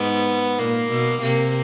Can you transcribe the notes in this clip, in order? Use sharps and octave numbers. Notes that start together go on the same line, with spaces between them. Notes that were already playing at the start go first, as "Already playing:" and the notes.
Already playing: G#2 B3
A#2 A#3
B2
C3 A#3